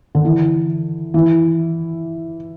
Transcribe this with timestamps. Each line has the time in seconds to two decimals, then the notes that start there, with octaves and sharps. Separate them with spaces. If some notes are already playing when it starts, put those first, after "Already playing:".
0.15 D3
0.25 E3
1.14 E3